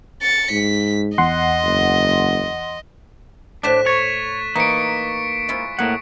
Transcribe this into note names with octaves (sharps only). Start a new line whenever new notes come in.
A6 C#7
G#2 B6
E2 D#5 F#5 C6
F#1
A2 D4 C5 D5 F#6 B6 E7
C#5 C#6 A6
E3 A#3 D#4 B6 C#7 D7
G#3 E4 F4
A2 A#3 G#4 F#5